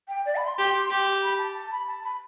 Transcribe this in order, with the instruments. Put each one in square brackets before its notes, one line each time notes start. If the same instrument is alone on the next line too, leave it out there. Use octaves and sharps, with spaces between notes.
[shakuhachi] G5
D5
B5
C6
[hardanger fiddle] G4 [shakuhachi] C6
[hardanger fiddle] G4
[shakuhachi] B5
A5
A5
B5
A5
B5